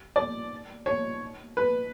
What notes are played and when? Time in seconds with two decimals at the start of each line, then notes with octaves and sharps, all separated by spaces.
0.16 D5
0.86 C#5
1.57 B4